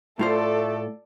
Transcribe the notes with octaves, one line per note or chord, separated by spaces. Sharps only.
A2 A3 F4 A4 C5 D5